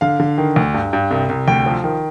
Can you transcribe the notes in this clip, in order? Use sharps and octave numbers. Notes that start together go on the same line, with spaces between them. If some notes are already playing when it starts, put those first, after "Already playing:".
D3 F5
D3
D#3
D2
G2
G2
C2
C2
D2 G5
F3
D#3